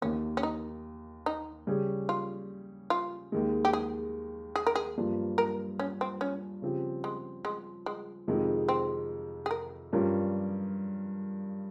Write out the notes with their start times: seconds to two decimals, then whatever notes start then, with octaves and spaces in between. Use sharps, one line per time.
0.02 D#2 D#3 A#3 C#4
0.37 C#4
0.43 D#4
1.26 D#4
1.67 C#3 G3 C#4 G#4
2.09 F4
2.90 F4
3.32 D#2 D#3 G#3
3.65 G4
3.73 G#4
4.56 G#4
4.67 A#4
4.75 G#4
4.98 G2 F3 A#3 F4
5.38 A#4
5.79 C#4
6.01 C4
6.21 C#4
6.62 C#3 F3 C4 G4
7.04 G#3
7.45 G#3
7.86 G#3
8.28 F2 C3 D#3 G#3
8.69 C4
9.46 G#4
9.51 A#4
9.93 G2 G3 C#4 F4 A#4